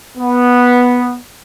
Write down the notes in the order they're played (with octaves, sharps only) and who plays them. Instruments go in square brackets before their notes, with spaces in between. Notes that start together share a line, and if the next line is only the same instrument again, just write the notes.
[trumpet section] B3